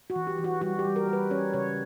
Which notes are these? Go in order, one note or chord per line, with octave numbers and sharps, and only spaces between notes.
F#4
E3
G4
E3
F#4
G3 F#4
G4
G3
A#4
G3
B4
C#4 C#5
C#3 C#5